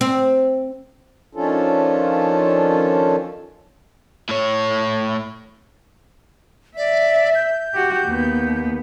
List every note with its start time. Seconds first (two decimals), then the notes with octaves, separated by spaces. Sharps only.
0.01 C4
1.35 D#3 F3 C#4 D4 F4 A4
4.29 A2 C#5
6.77 D5 E5
7.35 G6
7.74 F#4 G4
8.06 D#2 B3